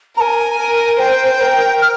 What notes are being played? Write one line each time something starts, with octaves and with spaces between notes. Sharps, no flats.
A#4 G#5 A#5
A#4
C5 G5
A#4
F6